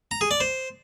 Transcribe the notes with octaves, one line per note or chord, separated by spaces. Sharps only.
A#5
G#4
D5
C5